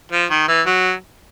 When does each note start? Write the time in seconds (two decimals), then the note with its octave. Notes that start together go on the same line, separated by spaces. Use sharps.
0.12 F3
0.31 D#3
0.48 E3
0.66 F#3